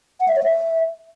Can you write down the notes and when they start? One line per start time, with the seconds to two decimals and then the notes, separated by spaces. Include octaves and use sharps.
0.20 F#5
0.28 E5
0.36 C#5
0.43 E5